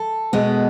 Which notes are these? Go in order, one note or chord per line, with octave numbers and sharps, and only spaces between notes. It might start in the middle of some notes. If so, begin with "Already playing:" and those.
Already playing: A4
B2 G#3 B3